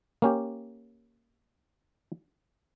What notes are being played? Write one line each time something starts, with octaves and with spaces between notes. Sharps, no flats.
A#3 C#4 G4